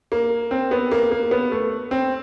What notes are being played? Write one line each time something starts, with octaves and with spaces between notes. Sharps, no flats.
A#3
C4
B3
A#3
A#3
B3
A3
C4